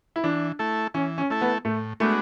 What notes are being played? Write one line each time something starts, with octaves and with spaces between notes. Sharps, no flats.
E4
E3 D4
A3 E4 A4
E3 C#4
C#4
A3 E4 A4
B3
A2 A3
G#3 A3 B3 D4 F#4